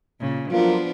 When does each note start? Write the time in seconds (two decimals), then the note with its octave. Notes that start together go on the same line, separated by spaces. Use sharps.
0.20 A#2 C#3
0.51 F3 F#3 A#3 B3 D4 F4